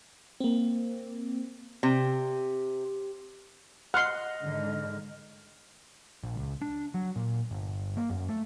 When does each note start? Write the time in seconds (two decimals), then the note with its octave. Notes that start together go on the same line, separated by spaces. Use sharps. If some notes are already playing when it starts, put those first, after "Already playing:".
0.40 A#3 C4
1.83 C3
3.94 D#5 F#5 C6 F6
4.42 G#2 D3 D#3
6.24 A#1
6.36 C#2
6.62 D4
6.94 F#3
7.16 A#2
7.51 G1
7.97 A#3
8.10 F#2
8.29 A3